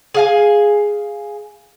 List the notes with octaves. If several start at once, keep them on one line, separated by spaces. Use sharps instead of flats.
G#4 F5 G#5